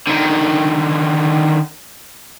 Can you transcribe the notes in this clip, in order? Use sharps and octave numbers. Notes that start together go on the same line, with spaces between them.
D3 D#3